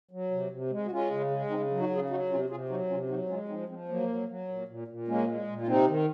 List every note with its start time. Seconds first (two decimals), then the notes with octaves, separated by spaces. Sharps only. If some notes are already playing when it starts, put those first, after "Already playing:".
0.11 F#3
0.31 C3
0.51 C3
0.71 G#3
0.86 F#4
0.91 G#3 C#4 F4
1.10 C#3
1.30 G#3
1.50 C#3 C4 D#4
1.70 F#3
1.80 D#4 F#4
1.90 C#3
1.95 F4 G#4
2.10 F#3 D#4 F#4
2.30 C3 C#4 F4
2.50 C3 F4 G#4
2.69 F#3 D#4 F#4
2.89 C3 C#4 F4
3.09 F#3 D#4 F#4
3.29 G#3 C#4 F4
3.48 F3 C4 D#4
3.68 F3 G#3 C4
3.89 F#3 A#3
4.09 F#3
4.28 F#3
4.48 A#2
4.68 A#2
4.88 A#2
5.08 G#3 A#3 C#4
5.28 G#3
5.47 A#2
5.61 F4
5.67 C3 C4 D#4
5.88 D#3